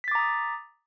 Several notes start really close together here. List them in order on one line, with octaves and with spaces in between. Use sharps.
B6 A6 D6 A#5 D#6